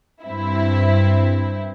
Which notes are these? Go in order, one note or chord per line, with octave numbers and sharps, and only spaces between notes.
G2 C4 E4